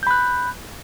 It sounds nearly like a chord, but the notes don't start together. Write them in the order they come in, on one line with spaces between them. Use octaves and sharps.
G6 B5 F#6